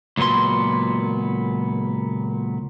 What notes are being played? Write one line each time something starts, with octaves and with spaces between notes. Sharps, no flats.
C#2 A#2 F#3 B3 C6